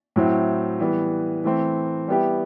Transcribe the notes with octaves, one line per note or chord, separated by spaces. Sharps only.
A2 F#3 C4 E4
E3 G3 B3
E3 A3 C4
G3 B3 E4 G4